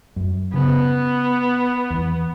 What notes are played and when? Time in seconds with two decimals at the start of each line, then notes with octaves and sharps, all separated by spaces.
0.16 F#2
0.54 C#3 B3
1.90 E2